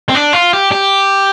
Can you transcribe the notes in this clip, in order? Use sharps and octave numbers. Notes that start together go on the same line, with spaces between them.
C4
D4
F4
G4
G4